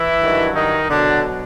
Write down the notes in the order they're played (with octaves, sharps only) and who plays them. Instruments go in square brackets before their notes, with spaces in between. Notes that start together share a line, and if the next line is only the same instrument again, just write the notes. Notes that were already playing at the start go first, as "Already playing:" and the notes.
Already playing: [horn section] E3 E4
G2 D#3 F#3
D#3 D#4
B2 D3 F#3 D4